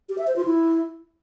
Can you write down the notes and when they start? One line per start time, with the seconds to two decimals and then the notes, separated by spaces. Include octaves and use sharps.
0.09 G4
0.18 E5
0.27 C5
0.36 F4
0.45 E4